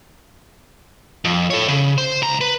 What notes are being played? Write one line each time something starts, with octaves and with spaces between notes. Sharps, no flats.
F2
A4 C#5
C#3
C5
C#2 A#5
B4